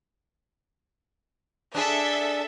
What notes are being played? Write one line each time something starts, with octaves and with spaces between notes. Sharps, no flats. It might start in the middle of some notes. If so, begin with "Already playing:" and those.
D4 G#4 A4 E5